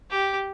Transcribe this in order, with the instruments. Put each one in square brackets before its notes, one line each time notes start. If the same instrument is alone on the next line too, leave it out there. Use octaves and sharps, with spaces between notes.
[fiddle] G4